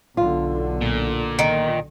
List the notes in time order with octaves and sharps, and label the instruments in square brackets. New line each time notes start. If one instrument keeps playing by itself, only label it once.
[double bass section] B1 D3 [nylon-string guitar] F4
[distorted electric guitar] A#2
[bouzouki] D#3